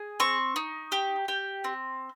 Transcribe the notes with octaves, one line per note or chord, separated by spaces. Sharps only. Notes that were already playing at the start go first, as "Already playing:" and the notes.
Already playing: G#4
C4 C#6
D#4
G4
G4
C4